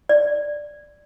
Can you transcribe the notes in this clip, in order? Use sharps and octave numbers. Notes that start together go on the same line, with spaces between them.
D5